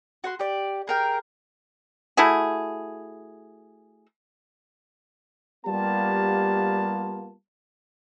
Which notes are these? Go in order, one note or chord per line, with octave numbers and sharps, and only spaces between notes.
F#4 F#5 C6
G4 D5
G#4 A#4 G5
A3 E4 F#4 G#4
G3 A#3 B3 F4 G4 A5